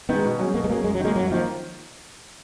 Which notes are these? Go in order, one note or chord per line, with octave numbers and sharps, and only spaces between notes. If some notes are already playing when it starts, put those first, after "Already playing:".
D#3 G#3 B3
B2
F#3 C#4 G#4
B2 A#3
G#3
F#3 A#3 C#4 G#4
F#2 G#3
F#3
D#3 G#3 A#3
F#2 F#3
D#3 F3 A#3